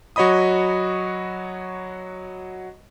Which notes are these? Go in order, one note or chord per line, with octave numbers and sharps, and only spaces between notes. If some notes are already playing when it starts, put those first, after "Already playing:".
F#3 F#4 C#5 D#5 B5 D#6